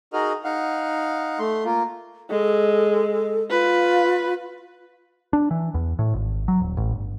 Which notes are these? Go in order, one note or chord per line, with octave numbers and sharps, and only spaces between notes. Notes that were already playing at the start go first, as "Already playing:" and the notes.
D#4 F#4 G#4 A#4 D#5 F6
D#4 F5 F#5
A3 C6
A#3 F4
G#3 A4
F4 B4
D4
E3
E2
A2
G#1
F#3
D#1
A1
G1